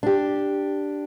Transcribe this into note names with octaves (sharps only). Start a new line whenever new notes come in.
D4 G4